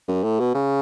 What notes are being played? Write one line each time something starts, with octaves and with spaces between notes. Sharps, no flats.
F#2
A2
B2
C#3